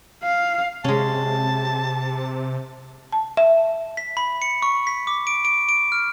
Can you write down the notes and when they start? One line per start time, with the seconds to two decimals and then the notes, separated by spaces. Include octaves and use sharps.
0.23 F5
0.84 C3 G#3 C#4 A5
3.12 A5
3.37 E5
3.97 B6
4.17 B5
4.42 C#7
4.62 C#6
4.87 B6
5.07 D6
5.27 D7
5.45 D7
5.69 D7
5.92 F6